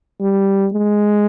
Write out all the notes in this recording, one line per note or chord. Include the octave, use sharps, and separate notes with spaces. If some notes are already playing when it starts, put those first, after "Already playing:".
G3
G#3